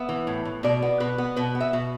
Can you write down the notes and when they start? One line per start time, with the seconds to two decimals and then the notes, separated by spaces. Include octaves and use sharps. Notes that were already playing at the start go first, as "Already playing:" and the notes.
Already playing: B3 E5
0.09 E3
0.27 A2
0.45 A2
0.63 B2 D5
0.82 B3
1.00 B2 B4
1.18 B3
1.36 B2 B4
1.55 B3
1.60 E5
1.73 B2